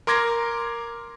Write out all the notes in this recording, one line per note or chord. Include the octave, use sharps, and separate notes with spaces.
A#4 C6 D6 G#6 A#6